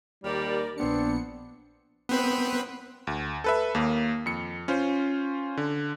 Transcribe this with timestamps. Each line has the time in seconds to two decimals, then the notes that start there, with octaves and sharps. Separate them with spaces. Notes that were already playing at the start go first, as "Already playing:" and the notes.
0.24 D#2 G3 A#4 D5
0.78 A#1 B3 C4 D4 C#7
2.09 B3 C4 B4
3.07 D2
3.44 A4 B4 E5
3.75 D#2 A#3
4.26 F2 C#7
4.68 C#4 F4 C5
5.57 D3